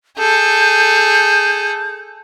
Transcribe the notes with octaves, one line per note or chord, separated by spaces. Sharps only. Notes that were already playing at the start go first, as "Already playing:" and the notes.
G#4 A4 G6